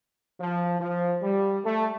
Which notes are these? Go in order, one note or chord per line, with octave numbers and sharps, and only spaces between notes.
F3
F3
G3
A3